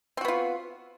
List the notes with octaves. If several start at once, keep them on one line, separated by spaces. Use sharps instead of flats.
B3 C4 F4 F#4